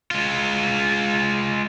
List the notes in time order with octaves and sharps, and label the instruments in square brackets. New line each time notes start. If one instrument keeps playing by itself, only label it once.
[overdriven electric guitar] G#3 F4